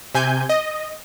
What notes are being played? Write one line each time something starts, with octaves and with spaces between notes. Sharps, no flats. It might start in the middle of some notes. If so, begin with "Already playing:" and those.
C3 G#5 G6
D#5